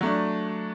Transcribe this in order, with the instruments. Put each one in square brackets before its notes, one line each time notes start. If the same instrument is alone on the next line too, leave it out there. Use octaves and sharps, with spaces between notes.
[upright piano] F#3 A3 D4